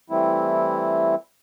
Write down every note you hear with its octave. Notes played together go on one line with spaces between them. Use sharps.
E3 G3 A3 C4 E4